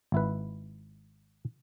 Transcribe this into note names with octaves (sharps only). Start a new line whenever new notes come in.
G#1 E4 B4